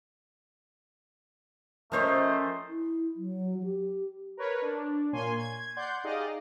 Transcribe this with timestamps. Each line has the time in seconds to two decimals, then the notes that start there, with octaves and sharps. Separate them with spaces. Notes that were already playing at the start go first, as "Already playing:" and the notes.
1.92 F3 A3 C#4 A#4 C5 C#5 D#5
2.69 E4
3.16 F#3
3.64 G4
4.37 A#4 B4 C#5
4.62 D4
5.13 A#2 A#3 C#5 G#5 C6
5.37 G#6
5.77 D5 F#5 C6 G6
6.04 D#4 G4 G#4 D5 D#5 F5